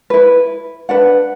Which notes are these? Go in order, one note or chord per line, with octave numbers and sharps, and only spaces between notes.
E4 B4
D4 B4 F#5